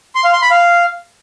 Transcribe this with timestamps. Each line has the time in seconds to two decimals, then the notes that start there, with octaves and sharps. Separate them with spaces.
0.15 C6
0.24 F5
0.33 C6
0.42 B5
0.51 F5